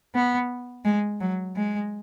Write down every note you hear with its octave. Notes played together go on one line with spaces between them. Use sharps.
B3
G#3
F#3
G#3